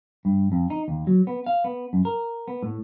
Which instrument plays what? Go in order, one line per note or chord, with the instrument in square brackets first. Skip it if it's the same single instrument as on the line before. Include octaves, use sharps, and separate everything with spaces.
[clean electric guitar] G2
F2
D#4
D#2
F#3
B3
F5
B3
F#2
A#4
B3
A2